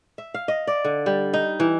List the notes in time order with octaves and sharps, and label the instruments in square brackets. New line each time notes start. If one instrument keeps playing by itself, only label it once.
[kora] E5
F5
D#5
D5
D3
G3
D#4
E3